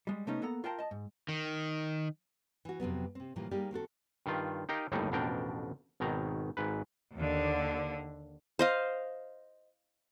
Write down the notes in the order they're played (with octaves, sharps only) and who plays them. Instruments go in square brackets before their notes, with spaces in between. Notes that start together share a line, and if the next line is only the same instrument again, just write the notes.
[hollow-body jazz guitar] G3 G#3
C3 A3 B3 C#4 D#4
A#3 B3 A4 F#5 A#5
F4 A#4 F5 G5 A5 A#5
D#5 A5
G#2
[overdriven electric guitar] D#3
[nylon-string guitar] E3 F#4
F2 C3 F#3 B3
C3 C4
A2 C3 E3 F3 G3 A#3
G3 A#3 D#4 G4 G#4 D5
D#3 C4 F#4 A4
[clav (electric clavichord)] G2 D#3 F4
D#4 G4 A#4 D#5 F5
G1 D#2 A2 G3 D#4
A1 F2 B2 D4 A#4 G5
G#1 B2 D#3 A#5
G#1 G#2 B4
[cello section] D#2 D3
[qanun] C5 D#5 F5